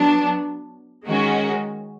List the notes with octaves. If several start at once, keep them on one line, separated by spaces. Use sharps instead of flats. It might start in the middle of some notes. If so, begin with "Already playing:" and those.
Already playing: F#3 B3 D4
D#3 G#3 C#4 F#4